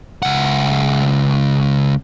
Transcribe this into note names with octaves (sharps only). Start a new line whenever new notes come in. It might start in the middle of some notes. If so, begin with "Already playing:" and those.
C#2 F#5